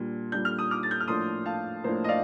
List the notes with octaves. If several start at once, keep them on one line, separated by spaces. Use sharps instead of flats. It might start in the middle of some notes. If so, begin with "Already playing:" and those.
Already playing: A#2 G3 D4
A#2 G3 D4 G6
F6
D#6
D6 F6
A6
G6
F6
A2 F3 A#3 D4 C6 D#6
F5 A5
A2 F3 A#3 D4 C5
D#5
D5 F5